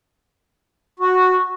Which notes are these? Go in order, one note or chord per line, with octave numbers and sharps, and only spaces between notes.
F#4